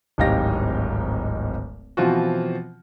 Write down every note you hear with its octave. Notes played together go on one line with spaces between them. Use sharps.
D1 G#1 D#4 G4 F5 A#6
B2 E3 F3 C4 F4 F#4